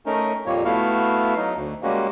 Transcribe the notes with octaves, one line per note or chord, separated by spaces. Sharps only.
A3 C#4 D#4 A#4
F2 A#2 G3 A#3 C#5
A3 B3 E4 F#4 F5
F#3 D#4
D2
G3 G#3 A#3 C#4 F#4